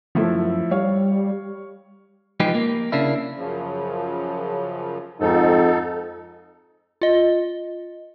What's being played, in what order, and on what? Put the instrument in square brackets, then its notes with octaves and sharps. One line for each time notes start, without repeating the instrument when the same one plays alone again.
[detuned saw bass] F#2 [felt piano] F3 A3 E4
[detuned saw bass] G3 [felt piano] C#5 F5
[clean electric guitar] F3 G#3 D#4 G4 G#4 B4
A#3
C#3 A#3 D4 E4
[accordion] F#2 C#3 F3
[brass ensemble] F2 G#2 [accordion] D#4 A4
[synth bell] F4 D#5